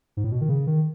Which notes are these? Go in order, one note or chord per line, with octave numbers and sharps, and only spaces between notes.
G#2
A2
B2
D#3
C#3
D#3